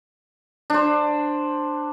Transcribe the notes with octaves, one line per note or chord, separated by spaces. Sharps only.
D4 C5